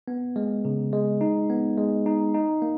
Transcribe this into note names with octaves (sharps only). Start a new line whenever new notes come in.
B3
G#3
C#3
G#3
D#4
B3
G#3
D#4
D#4
A#3